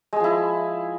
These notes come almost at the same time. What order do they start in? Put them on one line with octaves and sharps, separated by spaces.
G#3 G#4 F3 E4